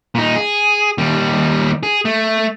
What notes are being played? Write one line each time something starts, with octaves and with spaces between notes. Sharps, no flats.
A#2 D#4
G#4
D#2 G3
G#4
A3